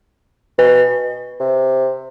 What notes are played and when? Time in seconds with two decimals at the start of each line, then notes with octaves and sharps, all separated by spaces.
0.58 B2 B4
1.40 C3